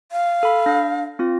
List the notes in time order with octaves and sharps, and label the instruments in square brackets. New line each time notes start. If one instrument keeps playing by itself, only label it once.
[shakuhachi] F5
[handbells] A4 B5
D4 A#6
C4 F4 A#6